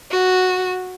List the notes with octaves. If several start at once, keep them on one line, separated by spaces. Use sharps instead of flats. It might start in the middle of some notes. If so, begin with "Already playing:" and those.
F#4